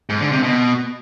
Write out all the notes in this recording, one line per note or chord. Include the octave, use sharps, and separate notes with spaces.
G#2
D3
C3
B2